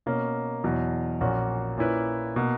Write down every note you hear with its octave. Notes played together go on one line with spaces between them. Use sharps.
B2 A#3 C#4
E2 B2 F#3
A#1 A#2 A#3 C#4 F#4
A#2 A#3 C#4 E4 B4
B2 A#3